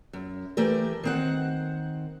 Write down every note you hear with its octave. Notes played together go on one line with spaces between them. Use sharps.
F#2
E3 A3 G4 A#4
D#3 C4 F#5